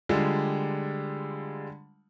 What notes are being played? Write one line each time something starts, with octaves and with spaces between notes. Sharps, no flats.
D3 G3 G#3 F4